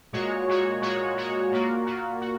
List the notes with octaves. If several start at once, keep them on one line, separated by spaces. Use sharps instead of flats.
A#2 G#3 F#4 C#5
A#2 G#3 F#4 C#5
A#2 G#3 F#4 C#5
A#2 G#3 F#4 C#5
A#2 A#3 F#4
A#2 A#3 F#4
F#4